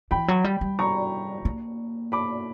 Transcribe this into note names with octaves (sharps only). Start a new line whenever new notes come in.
E3 G5 B5
F#3
G3
G3
A#5 C#6
A#3
B5 D6